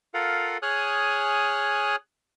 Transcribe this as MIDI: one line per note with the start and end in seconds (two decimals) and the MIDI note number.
0.14 0.58 65
0.14 0.58 69
0.14 0.58 70
0.14 0.58 77
0.14 0.58 78
0.62 1.96 68
0.62 1.96 73
0.62 1.96 80
0.62 1.96 87
0.62 1.96 89
0.62 1.96 90